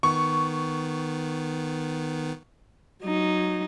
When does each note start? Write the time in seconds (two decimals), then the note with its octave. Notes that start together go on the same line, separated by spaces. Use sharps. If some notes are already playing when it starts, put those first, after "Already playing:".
0.03 D#3 B3 C#6
3.03 F#3 D#4